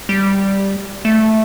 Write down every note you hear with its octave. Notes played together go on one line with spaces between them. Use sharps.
G3
A3